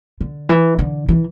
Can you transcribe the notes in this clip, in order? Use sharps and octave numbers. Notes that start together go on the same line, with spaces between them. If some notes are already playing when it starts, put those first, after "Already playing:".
D3
E3
D3
E3